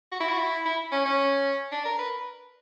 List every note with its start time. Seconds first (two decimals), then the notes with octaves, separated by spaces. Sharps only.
0.12 F#4
0.20 E4
0.29 F#4
0.39 E4
0.66 E4
0.92 C#4
1.06 C#4
1.72 D4
1.85 A#4
1.99 B4